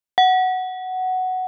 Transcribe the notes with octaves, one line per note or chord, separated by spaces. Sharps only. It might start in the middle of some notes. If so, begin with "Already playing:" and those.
F#5